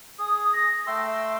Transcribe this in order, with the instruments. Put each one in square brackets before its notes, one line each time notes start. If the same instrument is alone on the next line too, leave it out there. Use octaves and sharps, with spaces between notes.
[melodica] G#4 [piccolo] D#6
[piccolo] A#6
[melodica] A3 C6 E6 [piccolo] G5